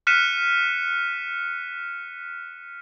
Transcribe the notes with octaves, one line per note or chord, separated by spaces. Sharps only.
F6 F#6 B6 C#7 D#7 E7